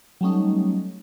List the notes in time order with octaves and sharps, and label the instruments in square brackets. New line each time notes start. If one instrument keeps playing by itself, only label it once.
[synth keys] F#3 G3 A3 C#4 D#4